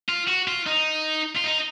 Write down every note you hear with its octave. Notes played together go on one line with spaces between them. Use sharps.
F4
F#4
F4
D#4
F4
D#4